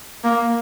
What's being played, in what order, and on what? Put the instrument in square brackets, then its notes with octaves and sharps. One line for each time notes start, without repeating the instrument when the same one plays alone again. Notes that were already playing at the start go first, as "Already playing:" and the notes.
[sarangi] A#3